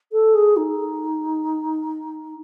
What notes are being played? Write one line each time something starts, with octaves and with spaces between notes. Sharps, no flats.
A4
G#4
D#4